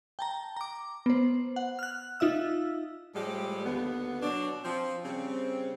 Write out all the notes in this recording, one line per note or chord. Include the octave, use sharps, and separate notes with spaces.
G5 A5 A#5
A#5 D6
B3 C5
F#5
F6 F#6
D#4 F4 E5 E6
A2 F3 G3 G#3 G4
D#2 D3 B3
B2 F#3 D4
F3 C4
C#3 G3 C4